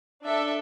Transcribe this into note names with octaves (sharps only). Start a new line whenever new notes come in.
D4 A4 E5